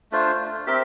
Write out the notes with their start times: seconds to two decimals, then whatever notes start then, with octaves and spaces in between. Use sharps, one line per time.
0.12 A3 D4 F4 C5
0.67 C4 G4 A#4 E5